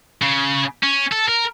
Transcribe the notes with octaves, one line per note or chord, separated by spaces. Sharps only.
C#3
C#4
A4
A#4